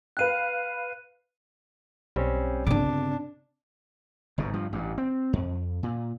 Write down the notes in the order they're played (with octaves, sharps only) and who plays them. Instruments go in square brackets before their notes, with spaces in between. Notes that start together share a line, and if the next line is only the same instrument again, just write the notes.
[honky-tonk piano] B4 F5 G5 [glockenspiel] F#6 D#7
[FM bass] B1 [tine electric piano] G3 C4 C#4
[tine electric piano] G1 D6 [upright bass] C#3 C4 [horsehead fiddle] D4
[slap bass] G1 G#2 B2
G2 F3
A1 G2
C4
F2
A#2